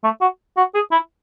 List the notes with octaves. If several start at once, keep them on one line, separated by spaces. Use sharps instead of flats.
A3
F#4
F#4
G#4
E4